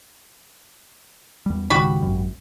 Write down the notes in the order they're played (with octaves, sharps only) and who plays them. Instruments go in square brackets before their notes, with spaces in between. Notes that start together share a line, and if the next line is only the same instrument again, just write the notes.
[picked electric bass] E2 G3
[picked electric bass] C#2 G#2 D#3 [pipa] G3 F#4 B5
[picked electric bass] G#1 F#2